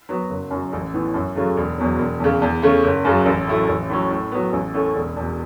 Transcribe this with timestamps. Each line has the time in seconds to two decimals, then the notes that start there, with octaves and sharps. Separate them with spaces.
0.09 F#3 B3 F#4
0.30 F#1
0.51 F#2 F#3
0.73 A1
0.93 A2 E3 B3
1.14 F#2
1.36 C#3 F#3 A3
1.57 E1
1.78 E2 B2 F#3
1.99 E1
2.20 E2 C#3
2.42 E2
2.62 C#3 A3 C#4
2.84 F#1
3.05 F#2 C#3 F#3
3.26 A1
3.47 A2 F#3 A3 E4
3.68 A1
3.90 A2 F#3 C#4
4.10 A2
4.32 F#3 B3
4.53 A1
4.74 A2 A3 C#4
4.95 E1
5.16 E2 B2